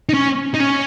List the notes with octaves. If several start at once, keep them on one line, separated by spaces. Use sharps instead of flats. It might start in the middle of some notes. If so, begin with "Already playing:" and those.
D#4
C#4
D#4
C#4